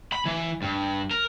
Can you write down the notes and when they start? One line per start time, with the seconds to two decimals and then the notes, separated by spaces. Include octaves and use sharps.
0.13 B5
0.26 E3
0.62 G2
1.11 A#4